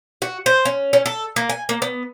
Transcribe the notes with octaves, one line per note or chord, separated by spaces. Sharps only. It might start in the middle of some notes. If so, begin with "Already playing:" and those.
F#4
C5
C#4
C#4
A4
A#3
G#5
A#3
B3